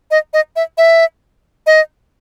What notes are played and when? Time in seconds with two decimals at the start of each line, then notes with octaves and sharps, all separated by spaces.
0.11 D#5
0.33 D#5
0.56 E5
0.78 E5
1.67 D#5